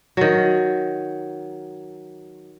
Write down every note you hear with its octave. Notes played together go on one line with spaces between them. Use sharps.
D#3 F#3